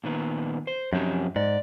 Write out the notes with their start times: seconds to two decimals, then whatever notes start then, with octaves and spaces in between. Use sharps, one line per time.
0.04 A#2 D#3 B3
0.67 C5
0.93 F#2 F3 C4 G4
1.36 G#2 D5